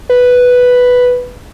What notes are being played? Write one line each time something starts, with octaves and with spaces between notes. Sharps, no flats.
B4